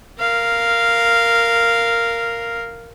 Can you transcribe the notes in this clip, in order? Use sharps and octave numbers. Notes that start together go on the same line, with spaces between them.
A#4 F5